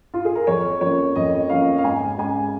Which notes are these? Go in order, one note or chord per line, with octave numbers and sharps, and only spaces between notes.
F4
G#4
A#4
F2 C#5
F3 A#3 C#4 C#5
F2 D#5
F3 A#3 C#4 F5
F5
G#2 G#5
G#3 C#4 G#5